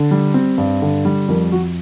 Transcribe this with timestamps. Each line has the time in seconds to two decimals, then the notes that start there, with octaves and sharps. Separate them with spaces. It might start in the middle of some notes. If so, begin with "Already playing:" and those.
Already playing: D3
0.11 G3
0.34 C4
0.58 G2
0.82 D3
1.05 G3
1.28 F2 A#4
1.52 F2 F#4